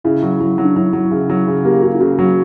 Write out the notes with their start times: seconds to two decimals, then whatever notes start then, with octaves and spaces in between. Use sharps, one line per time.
0.04 C#3 E4
0.23 F#3
0.41 F#3
0.58 F#3
0.65 D4
0.76 F#3 E4
0.93 F#3
1.11 C#3
1.30 F#3
1.47 C#3
1.64 A#3 G4
1.82 C#3 F#4
1.95 E4
2.00 C#3 F#4
2.19 F#3